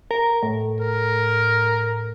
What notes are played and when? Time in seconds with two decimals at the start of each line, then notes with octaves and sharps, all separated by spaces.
0.11 A#4
0.43 A2
0.80 A#4